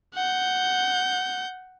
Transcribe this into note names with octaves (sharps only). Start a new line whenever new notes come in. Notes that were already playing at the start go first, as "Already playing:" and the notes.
F#5 G6